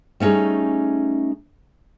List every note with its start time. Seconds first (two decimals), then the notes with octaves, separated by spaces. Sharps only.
0.20 G3 A3 C#4 D#4 G#4